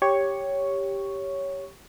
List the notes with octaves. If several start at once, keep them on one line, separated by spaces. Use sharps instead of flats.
G4 C#5 C#6